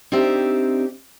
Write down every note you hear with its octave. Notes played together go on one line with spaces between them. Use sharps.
C4 D4 D#4 G4 C5 E5